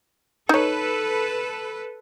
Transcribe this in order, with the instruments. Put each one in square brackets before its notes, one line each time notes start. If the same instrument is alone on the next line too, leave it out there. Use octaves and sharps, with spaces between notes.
[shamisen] D#4 C#5 [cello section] A4 B4